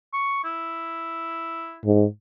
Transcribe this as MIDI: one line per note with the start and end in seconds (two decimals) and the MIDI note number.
0.13 0.43 85
0.44 1.78 64
1.85 2.06 44